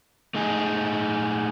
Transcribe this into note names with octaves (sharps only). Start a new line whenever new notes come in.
A3 D#4 G#4